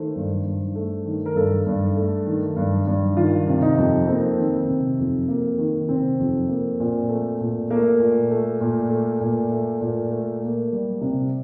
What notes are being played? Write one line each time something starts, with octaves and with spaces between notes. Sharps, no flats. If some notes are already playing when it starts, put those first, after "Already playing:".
Already playing: D#3 A3 C5
G2
G2
A3
D#3
A#4
G2 A4
G2
A3
D#3
G2
G2
D#3 F4
C3
D#4
F2
A#3 C4
D#3
C3
F2
A#3
D#3
C3 C4
F2
A#3
A#2
A3
A#2
A3 A#3
A#2
A3
A#2
A3
A#2
A3
A#2
A3
A#3
G3
C3